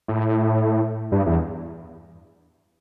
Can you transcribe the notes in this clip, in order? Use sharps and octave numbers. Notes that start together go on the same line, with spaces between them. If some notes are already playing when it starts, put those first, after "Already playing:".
A2
G2
E2